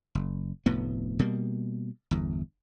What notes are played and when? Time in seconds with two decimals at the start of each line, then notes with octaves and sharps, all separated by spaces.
0.15 F#1
0.66 F1 D2 A2 B3
1.19 B2 G3 A#3
2.11 G1 E2